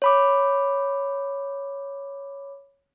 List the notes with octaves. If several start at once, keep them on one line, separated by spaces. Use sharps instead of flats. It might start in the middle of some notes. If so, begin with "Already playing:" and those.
C#5 B5 D6